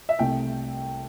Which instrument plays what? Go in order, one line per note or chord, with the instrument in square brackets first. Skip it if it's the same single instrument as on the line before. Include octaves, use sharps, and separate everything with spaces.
[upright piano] E5
C2 C3 A3 G5